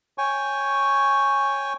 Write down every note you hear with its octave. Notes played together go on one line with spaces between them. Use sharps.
C#5 G5 G#5 C#6